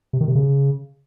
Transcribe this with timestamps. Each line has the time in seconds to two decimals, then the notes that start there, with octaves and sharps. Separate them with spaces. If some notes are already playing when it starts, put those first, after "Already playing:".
0.13 C3
0.21 D#3
0.28 C3
0.35 C#3